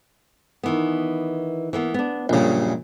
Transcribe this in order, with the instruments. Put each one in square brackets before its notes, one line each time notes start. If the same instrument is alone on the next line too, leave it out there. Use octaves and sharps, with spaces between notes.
[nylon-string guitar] D#3 E3 B3
E3 A#3 B3
B3 D4
[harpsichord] A#1 C#3 [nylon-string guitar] F#2 G3